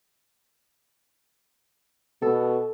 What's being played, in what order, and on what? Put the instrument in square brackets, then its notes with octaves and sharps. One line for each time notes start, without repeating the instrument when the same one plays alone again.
[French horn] B2 [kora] A4